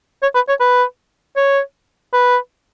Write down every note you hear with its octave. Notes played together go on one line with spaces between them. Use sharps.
C#5
B4
C#5
B4
C#5
B4